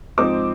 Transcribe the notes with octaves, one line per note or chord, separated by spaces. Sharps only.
G#2 F3 C4 D#4 D6